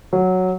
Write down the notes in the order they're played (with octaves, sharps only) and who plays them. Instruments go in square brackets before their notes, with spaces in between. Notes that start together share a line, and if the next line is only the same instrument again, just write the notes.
[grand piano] F#3